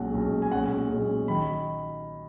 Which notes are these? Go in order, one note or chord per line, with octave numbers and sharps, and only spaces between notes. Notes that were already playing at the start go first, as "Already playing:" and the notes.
Already playing: B1 A#2 G#3 C#4 F#5
B1 A#2 G#3 C#4
G#5
B1 A#2 G#3 C#4 F#5
B1 A#2 G#3 C#4
D#3 B5